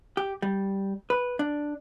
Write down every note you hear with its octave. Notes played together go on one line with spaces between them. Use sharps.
G4
G3
B4
D4